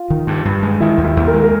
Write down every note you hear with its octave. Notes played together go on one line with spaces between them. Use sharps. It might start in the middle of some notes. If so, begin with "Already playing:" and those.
Already playing: F4
D#3
G2
G2
G#3
D#3 E4
D#2
E4
D#2
A#4
G#3
A#4